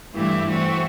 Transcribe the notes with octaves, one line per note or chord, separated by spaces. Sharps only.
G2 E3 A3 E4 G4
E3 A3 C4 F#4